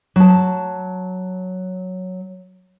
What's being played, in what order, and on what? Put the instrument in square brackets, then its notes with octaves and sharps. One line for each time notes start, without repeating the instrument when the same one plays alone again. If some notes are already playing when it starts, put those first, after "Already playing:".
[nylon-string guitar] F#3 A5